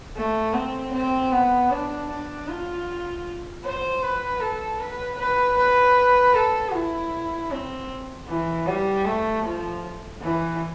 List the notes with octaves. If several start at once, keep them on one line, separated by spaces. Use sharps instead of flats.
A3
C4
C4
B3
D4
D4
F4
C5
B4
A4
B4
B4
B4
A4
E4
C4
E3
G3
A3
F3
E3